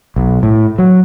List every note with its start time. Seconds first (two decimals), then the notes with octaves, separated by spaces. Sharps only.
0.16 B1
0.43 A2
0.79 F#3